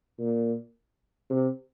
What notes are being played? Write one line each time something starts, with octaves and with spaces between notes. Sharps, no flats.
A#2
C3